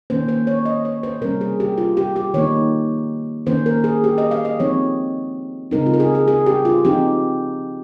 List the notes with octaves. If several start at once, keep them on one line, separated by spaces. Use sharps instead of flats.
D#3 A#3 C#4 C5
C5
C#5
D#5
C#5
C5
C3 G3 C#4 A#4
G#4
G4
F4
G4
G4
D#3 A#3 D#4 C#5
D#3 A#3 C#4 C5
A#4
G#4
G4
D#5
F5
D#5
F3 G#3 C4 D#4 C#5
C#3 G#3 C4 D#4 A#4
F4
A#4
G#4
G#4
G#4
G4
F4
F3 C4 D#4 G4